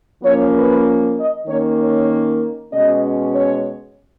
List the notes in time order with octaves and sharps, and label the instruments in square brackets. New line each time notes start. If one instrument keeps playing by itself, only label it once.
[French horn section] F3 A#3 C#4 C#5
B4
D#5
D#3 A#3 C#4 C#5
C#5
B2 G#3 C#4 D#5
C#5